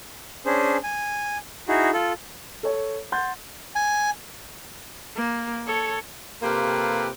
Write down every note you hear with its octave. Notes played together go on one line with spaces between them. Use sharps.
C#4 D4 G#4 C5
G#5
D#4 E4 F#4 G#4
F4 A4
A4 C#5
F#5 C6 G6 A6
G#5
A#3
A4 C#5
C3 A#3 F4 G4 A4 B4